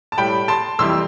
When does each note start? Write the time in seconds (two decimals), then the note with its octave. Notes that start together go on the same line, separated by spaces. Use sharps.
0.12 A5
0.18 A2 G3 G5 B5
0.48 A5 C6
0.79 F2 E3 G3 C6 E6